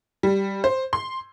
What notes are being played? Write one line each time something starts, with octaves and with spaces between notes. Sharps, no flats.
G3
C5
C6